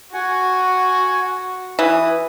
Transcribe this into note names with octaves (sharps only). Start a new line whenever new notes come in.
F#4 F#5 G#5
E3 B4 D#6